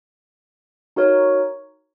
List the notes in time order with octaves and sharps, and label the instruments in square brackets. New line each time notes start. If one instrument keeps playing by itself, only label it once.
[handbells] D#4 F#4 A#4 C#5